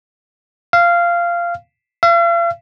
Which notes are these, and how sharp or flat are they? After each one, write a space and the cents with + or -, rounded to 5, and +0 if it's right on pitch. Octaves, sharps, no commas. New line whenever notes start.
F5 -15
F5 -45